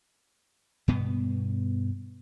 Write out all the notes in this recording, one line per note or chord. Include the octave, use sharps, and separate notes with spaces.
G2 B2 B3